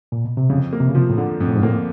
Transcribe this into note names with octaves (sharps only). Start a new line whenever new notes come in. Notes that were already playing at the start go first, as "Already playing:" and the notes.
A#2
B2
C3
F2 C#3
A#3
C3
C#3
C3 F3
A2
D3
F2 G#2
A2
G#2
A2 A#3